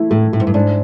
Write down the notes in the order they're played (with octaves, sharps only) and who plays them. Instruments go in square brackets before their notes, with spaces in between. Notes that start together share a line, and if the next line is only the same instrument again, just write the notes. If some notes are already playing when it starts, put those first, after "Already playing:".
Already playing: [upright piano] A3 E4
[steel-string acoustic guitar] A2 [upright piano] A3
[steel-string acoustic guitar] A2 [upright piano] E4
[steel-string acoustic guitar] G#2
G2
[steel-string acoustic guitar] G#2 [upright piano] D4